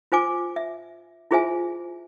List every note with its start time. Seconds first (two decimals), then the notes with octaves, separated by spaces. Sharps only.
0.12 F4 C5 G#5 D6
0.56 E5
1.31 E4 F4 G#4 C5 E5 G#5